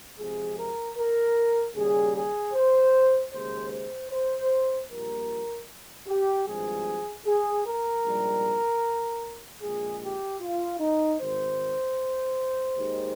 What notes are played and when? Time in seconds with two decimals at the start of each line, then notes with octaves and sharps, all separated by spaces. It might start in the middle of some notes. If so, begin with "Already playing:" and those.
0.17 F2 C3 F3 G#3 G#4
0.57 A#4
0.96 A#4
1.75 D#2 C#3 G3 G#4
2.14 G#4
2.53 C5
3.31 D#2 C#3 G#3 C5
3.72 C5
4.11 C5
4.90 A#1 A#2 G3 A#4
6.07 G4
6.46 G#1 G2 F3 G#3 G#4
7.26 G#4
7.65 A#4
8.05 A#1 G#2 G3
9.61 A#1 A#2 G#3 G#4
10.01 G4
10.40 F4
10.79 D#4
11.19 G#1 G#2 D#3 C5
12.76 D#2 D#3 G#3